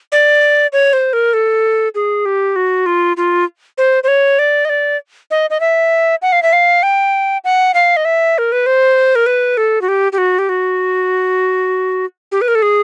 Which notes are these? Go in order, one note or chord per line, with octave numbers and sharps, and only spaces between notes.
D5
C#5
C5
A#4
A4
G#4
G4
F#4
F4
F4
C5
C5
C#5
D5
D#5
D5
D#5
D#5
E5
F#5
F5
E5
F5
G5
F#5
F5
D#5
E5
A#4
B4
C5
A#4
B4
A4
F#4
G4
G4
F#4
G4
F#4
G4
B4
A#4
A4
G#4